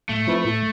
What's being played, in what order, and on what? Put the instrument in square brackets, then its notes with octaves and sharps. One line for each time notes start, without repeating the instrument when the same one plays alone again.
[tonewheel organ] A2 [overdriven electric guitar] A3
[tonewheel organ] F3 C4 E4 B4
A2